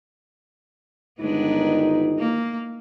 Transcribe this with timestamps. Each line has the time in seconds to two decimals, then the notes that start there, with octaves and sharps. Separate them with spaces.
1.20 G1 D#3 G#3 B3 D4 D#4
2.19 A#3